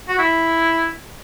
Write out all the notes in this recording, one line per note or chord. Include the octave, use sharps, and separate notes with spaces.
F#4
E4